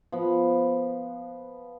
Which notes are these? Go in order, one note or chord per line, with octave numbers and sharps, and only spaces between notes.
F3 B3